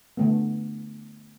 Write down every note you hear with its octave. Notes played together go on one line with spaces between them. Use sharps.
D3 A3 B3